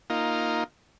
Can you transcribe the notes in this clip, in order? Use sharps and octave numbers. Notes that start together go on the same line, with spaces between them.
A#3 D#4 F4